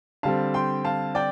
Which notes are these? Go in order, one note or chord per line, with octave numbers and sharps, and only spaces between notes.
D3 G3 C4 F5 A5
G5 C6
F5 A5
D5 G5